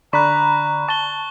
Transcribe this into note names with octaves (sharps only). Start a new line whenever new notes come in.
D3 D5 A#5 B5 C#6 F#6
A5 C#6 G7